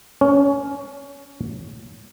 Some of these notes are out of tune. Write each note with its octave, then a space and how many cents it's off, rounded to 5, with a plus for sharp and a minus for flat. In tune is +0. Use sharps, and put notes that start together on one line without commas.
C#4 +20